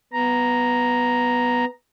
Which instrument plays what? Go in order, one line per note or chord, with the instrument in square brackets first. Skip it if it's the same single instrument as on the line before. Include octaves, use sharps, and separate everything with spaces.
[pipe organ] B3 A#5